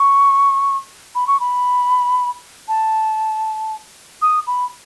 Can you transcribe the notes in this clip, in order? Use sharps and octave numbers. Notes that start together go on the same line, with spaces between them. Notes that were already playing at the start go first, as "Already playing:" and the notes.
Already playing: C#6
B5
C#6
B5
A5
D#6
B5